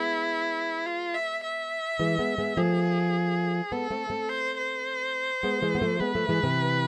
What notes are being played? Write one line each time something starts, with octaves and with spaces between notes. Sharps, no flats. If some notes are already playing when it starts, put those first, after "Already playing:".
Already playing: G#3 B3 E4
F4
E5
E5
E3 G#3
G#3 B3
G#3 B3
F3 A3 G#4
G#3 B3 A4
A3 C4
A3 C4
C5
C5
G#3 B3
E3 G#3
B3
F3 A3
G#3 B3 B4
F3 A3
E3 G#3
C3 E3